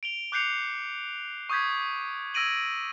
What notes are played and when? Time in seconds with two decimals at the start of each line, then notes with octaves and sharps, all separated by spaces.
0.03 D7 F7 G7
0.32 D6 F#6 G6 C7 C#7 F7
1.49 C#6 D#6 G6 G#6 B6
2.34 E6 G#6 A#6 D7 D#7 F#7